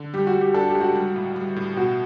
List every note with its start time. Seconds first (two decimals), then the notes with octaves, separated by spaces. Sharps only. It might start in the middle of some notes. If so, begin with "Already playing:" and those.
Already playing: D3
0.14 G3 G4
0.27 F#4
0.34 G3
0.41 G4
0.54 D4 A4
0.68 G4
0.75 C#2
0.81 F#4
0.95 G3
1.16 A2
1.36 G3
1.56 A2
1.77 B2 F#4